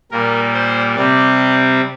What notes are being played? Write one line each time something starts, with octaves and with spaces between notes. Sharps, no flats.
A#2 G3 A#3 A#4
C5
C3 G3 C4 D5